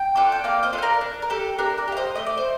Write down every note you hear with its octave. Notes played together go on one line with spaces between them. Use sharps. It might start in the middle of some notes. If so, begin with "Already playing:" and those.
Already playing: G5
D4 F4 A4
G5
A#3 D5 F5
C5 D#5
D4 F4 A4
C5
A#4 D5
D4
A#4
G4 A4
D4 A#4
A#4 D5
G4
F5
C5 D#5
A3 D#5
D5
C5